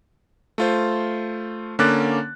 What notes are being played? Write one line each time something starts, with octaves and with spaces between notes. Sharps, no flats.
A3 F4 C5
D3 A#3 C#4 D6 F#6 A6